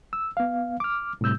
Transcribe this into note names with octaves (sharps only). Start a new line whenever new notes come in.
E6
B3 F5
D6 F6
A2 C3 G3 E6 G6